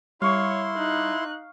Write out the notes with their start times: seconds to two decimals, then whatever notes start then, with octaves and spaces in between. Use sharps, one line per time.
0.22 G3 E4 C#5 F5 C6 C#6
0.76 D#4 F#6